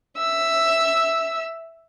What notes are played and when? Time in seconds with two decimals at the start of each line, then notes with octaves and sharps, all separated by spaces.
0.18 E5 E6